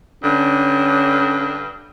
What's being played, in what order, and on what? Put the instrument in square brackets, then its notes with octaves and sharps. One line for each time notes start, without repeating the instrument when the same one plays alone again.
[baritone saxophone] G2 [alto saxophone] D3 [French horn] C#4